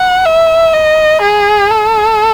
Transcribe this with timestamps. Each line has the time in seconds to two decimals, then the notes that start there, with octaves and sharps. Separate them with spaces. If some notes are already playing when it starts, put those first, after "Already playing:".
Already playing: F#5
0.25 E5
0.73 D#5
1.22 G#4
1.70 A4